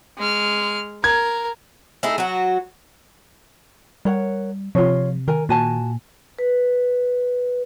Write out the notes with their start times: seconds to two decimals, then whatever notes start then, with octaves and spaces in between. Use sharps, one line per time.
0.18 G#3 F6
1.04 A#4 G#6
2.03 A3 D#4 E4 G#4
2.18 F#3 F#4
4.05 G3 A#4 C#5 F#5
4.75 C3 F3 F4 C#5
5.28 D#3 A#4 G#5
5.49 A#2 F#4 G#5 A5
6.39 B4